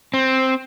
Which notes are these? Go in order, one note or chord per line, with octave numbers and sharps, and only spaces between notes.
C4